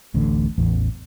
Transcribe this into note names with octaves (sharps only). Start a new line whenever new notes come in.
D1 A1 A2 D3
A1 E2